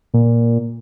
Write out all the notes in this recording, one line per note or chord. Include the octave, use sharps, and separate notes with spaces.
A#2